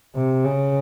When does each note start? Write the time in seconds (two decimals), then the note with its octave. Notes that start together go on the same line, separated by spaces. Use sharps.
0.15 C3
0.45 C#3